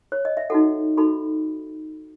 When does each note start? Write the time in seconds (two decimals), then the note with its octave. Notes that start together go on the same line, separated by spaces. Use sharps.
0.12 C#5
0.25 D#5
0.37 E5
0.50 D#4 F#4 A4 F#5
0.97 D#4 F#4 A4 B5